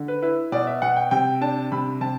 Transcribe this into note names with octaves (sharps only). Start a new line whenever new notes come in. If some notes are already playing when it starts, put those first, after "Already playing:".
Already playing: D3
B4
E4 B4
B2 D5
E5
B2 F#5
G5
C3 G5
D4 A5
C3 B5
C3 A5